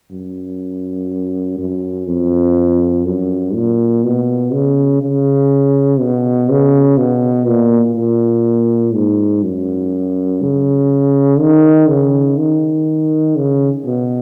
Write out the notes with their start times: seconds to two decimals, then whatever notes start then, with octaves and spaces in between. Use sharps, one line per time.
0.11 F#2
1.59 F#2
2.07 F2
3.06 F#2
3.55 A#2
4.04 B2
4.53 C#3
5.02 C#3
6.00 B2
6.49 C#3
6.98 B2
7.47 A#2
7.95 A#2
8.94 G#2
9.43 F#2
10.42 C#3
11.39 D#3
11.89 C#3
12.37 D#3
13.36 C#3
13.85 B2